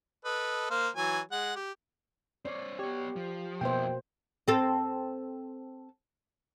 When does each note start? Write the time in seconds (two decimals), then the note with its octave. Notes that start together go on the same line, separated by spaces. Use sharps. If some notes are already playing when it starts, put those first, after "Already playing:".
0.25 A4 B4 D#5
0.70 A#3 C5 F5
0.96 E3 F#3 G#5
1.32 G#3 F#5
1.56 G4
2.45 C4 C#5 D5
2.79 B3 G4 C#5
3.16 F3
3.61 F2 B2 A#3 E4 C5 G5
4.48 C4 A4